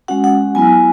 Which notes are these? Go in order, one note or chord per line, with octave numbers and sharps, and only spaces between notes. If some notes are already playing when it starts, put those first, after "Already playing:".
G#3 C#4 F#4 F#5
F#5
F#3 B3 E4 G#5